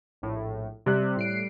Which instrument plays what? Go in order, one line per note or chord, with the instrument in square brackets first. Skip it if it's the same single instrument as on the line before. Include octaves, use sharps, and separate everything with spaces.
[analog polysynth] A#1 A2
[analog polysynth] C3 [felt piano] G3 F#6
[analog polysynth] A2 C7 D7